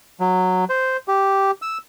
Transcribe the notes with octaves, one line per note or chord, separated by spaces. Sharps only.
F#3
C5
G4
E6